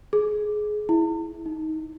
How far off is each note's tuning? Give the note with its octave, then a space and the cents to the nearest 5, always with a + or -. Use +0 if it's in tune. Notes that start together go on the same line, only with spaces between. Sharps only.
G#4 +20
E4 -5
D#4 +20